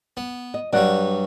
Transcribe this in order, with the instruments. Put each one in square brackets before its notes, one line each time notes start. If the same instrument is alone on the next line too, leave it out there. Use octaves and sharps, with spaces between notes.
[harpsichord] B3
[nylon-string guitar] D#5
[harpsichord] G2 F#3 G3 [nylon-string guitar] D5 F#5